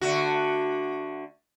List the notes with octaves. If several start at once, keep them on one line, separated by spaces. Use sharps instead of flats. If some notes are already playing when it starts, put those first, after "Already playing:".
D3 A3 F#4